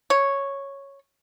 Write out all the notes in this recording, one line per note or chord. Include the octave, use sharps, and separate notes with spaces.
C#5